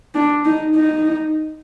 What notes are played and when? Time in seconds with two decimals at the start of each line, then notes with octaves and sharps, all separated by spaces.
0.15 D4
0.45 D#4
0.76 D#4